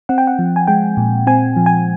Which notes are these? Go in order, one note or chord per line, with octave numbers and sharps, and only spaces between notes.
C4 F#5
G5
F#5
F3
G#5
G#3 G5
A#2
C4 G#5
F3
G#5